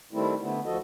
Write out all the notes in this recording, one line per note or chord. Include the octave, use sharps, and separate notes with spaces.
D#3 G3 A3 C4 E4
D3 A3 B3
D2 F3 F#4 A4 D#5